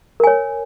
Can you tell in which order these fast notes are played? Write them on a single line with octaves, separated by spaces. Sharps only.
A#4 G#5 C#5